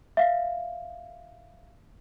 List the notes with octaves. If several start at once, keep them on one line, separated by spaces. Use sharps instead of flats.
E5 F5